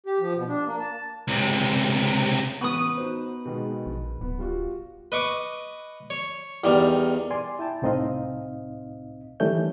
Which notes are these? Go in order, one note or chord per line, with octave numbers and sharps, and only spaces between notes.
G4
F3
B2
D4
A#3
A5
C#2 C3
A1 B3 B4 C#6 D#6
D#4 F#4 C5
B2 D#3 G#3
A#1
D1 B3
G3 F4 F#4
B4 D#5 C#6 D6
C#5
E2 D#3 G3
D5 G#5 C6
E4 G5 A5
C2 A2 C4 D#4 D#5 F5
D#3 E3 G3 A3 C#4 G6